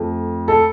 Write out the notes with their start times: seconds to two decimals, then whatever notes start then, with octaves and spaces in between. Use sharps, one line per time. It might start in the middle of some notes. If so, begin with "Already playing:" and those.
Already playing: F2 A3
0.48 A4